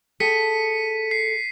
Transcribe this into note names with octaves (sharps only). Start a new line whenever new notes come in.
G#4 A4 G5 B6 C#7 D#7
C7